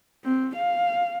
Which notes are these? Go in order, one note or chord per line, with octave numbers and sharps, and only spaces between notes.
C4
F5